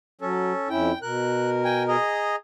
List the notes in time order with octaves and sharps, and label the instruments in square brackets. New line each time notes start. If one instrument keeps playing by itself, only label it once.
[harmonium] F#3 [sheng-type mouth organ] C#4 A4
[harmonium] F2 C#4 E4 [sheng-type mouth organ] G5
[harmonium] B2 A#4 [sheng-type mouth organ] F#6
[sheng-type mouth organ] G5 G#5
G#4 D#5 A#5